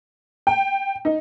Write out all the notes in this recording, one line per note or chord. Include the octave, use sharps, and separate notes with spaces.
G5
D#4